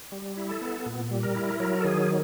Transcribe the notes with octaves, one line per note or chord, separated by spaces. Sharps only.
G3
E4
A4
B3
A#2
G3
A#4
E4
F#3 A#4
A4
D#3 G#4